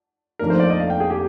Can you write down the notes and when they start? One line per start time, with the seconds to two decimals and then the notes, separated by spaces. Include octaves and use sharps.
0.39 F1 F2 D#3 A#3 D4 A#4
0.50 C5
0.60 D5
0.70 D#5
0.80 F5
0.90 G5
1.00 G#4
1.10 G4